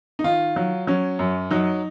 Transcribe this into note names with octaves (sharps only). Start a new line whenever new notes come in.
D#4
D#3 F4
F#3
F#3 C#4
F#2
F#3 D#4